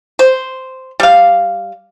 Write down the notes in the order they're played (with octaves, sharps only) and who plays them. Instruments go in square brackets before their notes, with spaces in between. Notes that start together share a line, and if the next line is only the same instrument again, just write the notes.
[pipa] C5
G3 F5